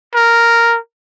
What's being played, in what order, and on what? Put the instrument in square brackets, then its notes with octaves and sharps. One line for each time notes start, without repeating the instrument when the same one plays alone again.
[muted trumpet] A#4